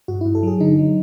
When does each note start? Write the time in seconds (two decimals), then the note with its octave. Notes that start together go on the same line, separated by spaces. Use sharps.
0.08 G2 F#4
0.21 G2 E4
0.35 A4
0.43 F#3 G#4
0.60 D3 D#4
0.79 F#3